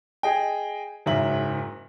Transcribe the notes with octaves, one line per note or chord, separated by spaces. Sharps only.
G#4 D#5 G5
F#1 G#2 F#3 E5 F#7